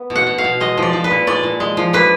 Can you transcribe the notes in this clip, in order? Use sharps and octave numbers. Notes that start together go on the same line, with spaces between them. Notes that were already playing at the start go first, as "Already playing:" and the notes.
Already playing: B3
B2
F#5
B2
F5
B2
G#3 D#5
F3
D5
F3
B4
A#2
G#3 D5
A#2
G#3
F3
A#3 B4